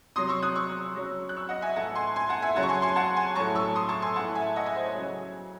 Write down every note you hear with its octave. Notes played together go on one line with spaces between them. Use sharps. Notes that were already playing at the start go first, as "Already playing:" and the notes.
C3 F#3 C6 D#6
C#6 E6
D#6 F#6
C#6 E6
C#3 F#3
F#6
C#6 E6
D#5 F#5
E5 G#5
A2 E3 F#5 A5
G#5 C6
G#5 C6
F#5 A5
E5 G#5
C#3 F#3 F#5 A5
C#6
G#5 C6
G#5 C6
F#5 A5
G#5 C6
A2 F#3 A5 C#6
C#6 E6
C6 D#6
A5 C#6
G#5 C6
A2 E3 F#5 A5
E5 G#5
D#5 F#5
E5 G#5
C5
C#5
C#3 F#3